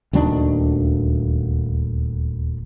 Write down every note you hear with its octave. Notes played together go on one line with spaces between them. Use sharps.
D#1 D2 D#3 D4